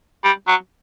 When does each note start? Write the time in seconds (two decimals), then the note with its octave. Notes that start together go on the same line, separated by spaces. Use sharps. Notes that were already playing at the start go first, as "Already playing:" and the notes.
0.24 G3
0.48 F#3